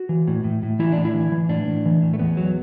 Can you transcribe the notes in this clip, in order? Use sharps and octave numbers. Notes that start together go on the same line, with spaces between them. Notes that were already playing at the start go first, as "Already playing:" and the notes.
Already playing: F#4
E3
A2
A2
A2
E3 E4
D4
A2
E4
E3
E3
A2 D4
A2
E3
A2
A3
E2 B3
F#3